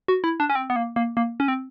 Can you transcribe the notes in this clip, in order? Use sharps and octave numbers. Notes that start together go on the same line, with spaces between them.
F#4
E4
D4
C#4
C4
B3
A#3
A#3
A#3
C#4
C4